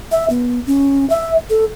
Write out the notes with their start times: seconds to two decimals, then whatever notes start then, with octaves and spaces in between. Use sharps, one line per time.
0.11 E5
0.30 B3
0.67 C#4
1.10 E5
1.50 A4